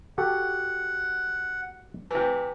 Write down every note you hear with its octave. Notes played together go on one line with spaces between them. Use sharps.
F#4 G4 A4 F#5
C3 E3